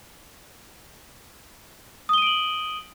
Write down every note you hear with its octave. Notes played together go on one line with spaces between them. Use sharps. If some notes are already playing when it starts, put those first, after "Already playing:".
D#6 D7 D#7 F#7 G7